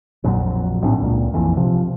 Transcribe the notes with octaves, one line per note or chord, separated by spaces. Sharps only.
A#1 F2 A#2 F#3
B1 A2 C4 D4
C#2 A#2
A#1 F2 E3
C3 F3